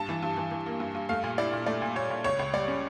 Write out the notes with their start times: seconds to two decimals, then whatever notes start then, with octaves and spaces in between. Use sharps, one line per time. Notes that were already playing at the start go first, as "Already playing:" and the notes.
Already playing: G2 A5
0.09 E3
0.22 G2
0.37 E3
0.51 E3
0.66 A#3
0.80 G2
0.95 G2
1.09 A3 F5
1.23 A#2
1.38 E4 D5
1.53 A#2
1.66 A3 D5
1.81 A#2
1.95 A#2 C#5
2.10 A#2
2.24 C#2 C#5
2.39 C#2
2.53 G3 D5
2.68 C#4